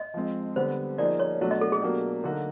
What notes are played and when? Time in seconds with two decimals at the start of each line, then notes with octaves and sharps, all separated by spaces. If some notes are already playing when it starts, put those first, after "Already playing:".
Already playing: D#5
0.14 F3 G#3 C4
0.56 D3 G3 B3 C5
0.98 F3 A#3 D#4 G#4 D5
1.20 C#5
1.40 B2 F#3 A3 D4 F#4
1.51 D#5
1.61 A4
1.72 G#4
1.82 B2 F#3 A#3 D4 G4
2.24 D3 F#3 A#3 D#4 F#4